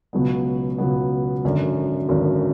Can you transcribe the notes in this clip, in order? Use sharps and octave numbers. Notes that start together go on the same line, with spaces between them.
C#2 B2 F#3 B3
C#2 B2 F#3 B3
G#1 F#2 D3
G#1 F#2 D3